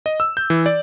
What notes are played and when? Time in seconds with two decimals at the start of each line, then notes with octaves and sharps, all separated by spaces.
0.06 D#5
0.20 E6
0.37 G6
0.50 E3
0.66 D5